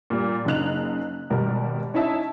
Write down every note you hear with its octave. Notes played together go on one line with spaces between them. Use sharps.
A#2 G3
F#1 C#3 D#4 F#6 F7
G#1 B2 G3 A#4
C#4 D#4 E4 E5 A5